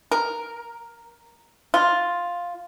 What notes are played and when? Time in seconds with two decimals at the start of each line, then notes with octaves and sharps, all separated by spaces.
0.12 A#4
1.74 F4